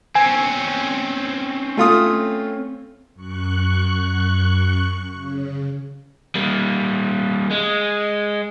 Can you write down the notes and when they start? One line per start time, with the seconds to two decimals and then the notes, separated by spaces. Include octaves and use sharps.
0.15 C4 C#4 G#5
1.77 A3 F4 D#6
3.14 F#2 C#6 F#6
5.13 C#3
6.35 G3 A#3
7.51 G#3